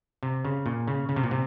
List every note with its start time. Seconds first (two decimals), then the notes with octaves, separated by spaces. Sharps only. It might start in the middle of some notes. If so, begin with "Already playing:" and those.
0.23 C3
0.45 C#3
0.66 A#2
0.88 C#3
1.09 C#3
1.16 C3
1.23 A#2
1.31 C3